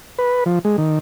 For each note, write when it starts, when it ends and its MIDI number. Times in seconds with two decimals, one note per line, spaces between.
0.18 0.44 71
0.46 0.59 53
0.65 0.77 56
0.78 0.99 51